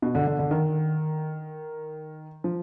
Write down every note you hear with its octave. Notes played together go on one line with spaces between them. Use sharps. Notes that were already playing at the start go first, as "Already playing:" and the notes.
B2
D3
D3
D3
D#3
F3